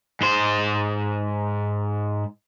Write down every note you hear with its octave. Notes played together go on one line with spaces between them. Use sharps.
G#2 C5